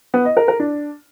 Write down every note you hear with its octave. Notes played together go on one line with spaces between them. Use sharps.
B3
D#5
A#4
A#4
D4